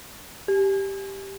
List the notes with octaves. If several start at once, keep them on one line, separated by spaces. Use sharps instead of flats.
G4